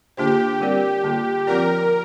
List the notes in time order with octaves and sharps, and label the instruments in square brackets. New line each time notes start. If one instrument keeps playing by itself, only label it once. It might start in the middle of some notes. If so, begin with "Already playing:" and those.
[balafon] D3 A#3 D4 F4 C5 [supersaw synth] G4
[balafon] G3 C4 A#4 D5
D3 A#3 F4
[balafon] F3 C4 F4 D5 [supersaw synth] A#4